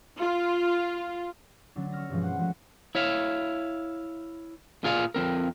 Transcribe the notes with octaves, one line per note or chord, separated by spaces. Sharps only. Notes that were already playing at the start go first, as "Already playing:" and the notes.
F4
D3 F#3 A3 C#4 D4
C#6 E6 F6 A#6
G2 B2 E3 F3 G#3
C5 F#5
F3 G#3 A3 F#4
E4 C#5 E5 F5
A#2 F4 G#4 D5 F5
F2 C4 A#4